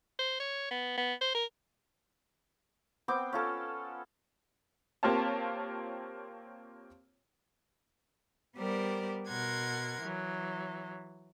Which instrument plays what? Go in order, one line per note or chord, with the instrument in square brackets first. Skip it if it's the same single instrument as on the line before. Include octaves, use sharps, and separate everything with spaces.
[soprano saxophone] C5
C#5
B3
B3
C5
A#4
[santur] B3 C4 G5 D6
C#4 F4 A4
[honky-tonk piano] A#3 C4 F4 G4 C#5 A5
[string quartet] G3 B3 G4 A#4 C5 D5
B2 A#4 F#5 C6 G#6
E3 F#3